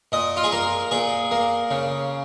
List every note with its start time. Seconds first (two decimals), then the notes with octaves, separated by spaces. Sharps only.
0.12 A#2 D#5
0.37 F4
0.44 G#4
0.52 A#3 A#4
0.91 A#2 G#4
1.31 A#3
1.71 C#3